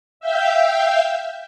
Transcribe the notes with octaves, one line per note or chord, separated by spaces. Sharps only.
E5 F5 G5 G6